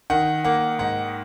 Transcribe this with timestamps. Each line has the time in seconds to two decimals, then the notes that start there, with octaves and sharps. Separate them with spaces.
0.10 D#3 F#5
0.44 A#3 F#5
0.79 G#2 F#5